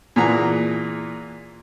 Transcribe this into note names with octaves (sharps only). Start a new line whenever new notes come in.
A#2 E3 G#4 F#5 A#5